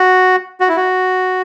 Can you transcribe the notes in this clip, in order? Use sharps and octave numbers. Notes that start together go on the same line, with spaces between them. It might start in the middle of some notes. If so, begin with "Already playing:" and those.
Already playing: F#4
F#4
E4
F#4